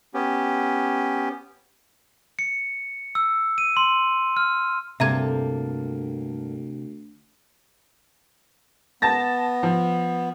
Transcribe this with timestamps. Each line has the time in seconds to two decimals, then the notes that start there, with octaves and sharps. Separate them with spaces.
0.14 B3 C#4 G4
2.39 C#7
3.15 E6
3.58 D#7
3.77 C6
4.37 F6
5.00 D2 G2 C3 A#3 A4 E5 A#5 G#6
9.02 B3 A5 A6 A#6
9.63 F3